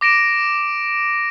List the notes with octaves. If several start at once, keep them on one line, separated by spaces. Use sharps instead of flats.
D6 A#6 D7 E7